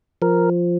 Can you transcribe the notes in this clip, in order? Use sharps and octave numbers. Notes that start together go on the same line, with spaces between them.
F3 A#4